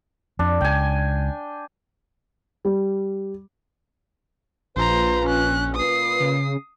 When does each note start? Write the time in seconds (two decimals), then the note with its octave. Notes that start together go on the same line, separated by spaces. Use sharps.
0.39 F2 D4
0.61 C#2 G5 G#5
2.65 G3
4.76 A#1 F4 B4 C5 A#5
5.25 C#4 F#6
5.75 A#2 F4 B4 D#6 C7
6.20 C#3